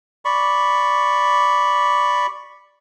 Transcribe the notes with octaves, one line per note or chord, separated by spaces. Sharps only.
D5 B5 C#6